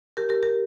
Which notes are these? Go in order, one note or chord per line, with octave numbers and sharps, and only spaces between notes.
G4 A#4
G4 A#4
G4 A#4